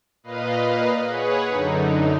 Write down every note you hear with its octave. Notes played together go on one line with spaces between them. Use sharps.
A#2 B4 D#5 F5
G#4 B4 C#5 F#5
F#2 D3 D#4